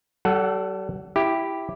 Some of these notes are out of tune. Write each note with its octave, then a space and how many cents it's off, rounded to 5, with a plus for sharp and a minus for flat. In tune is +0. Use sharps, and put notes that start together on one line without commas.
G3 -40 A4 +0 F#5 +0
E4 +0 G4 +0